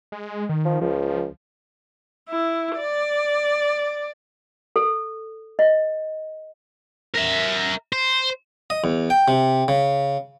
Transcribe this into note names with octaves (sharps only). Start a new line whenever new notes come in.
G#3
D#3
F3
C#2 F3
E4
D5
A4
D#5
A#4 E5
C5
D#5
E2
G5
C3
C#3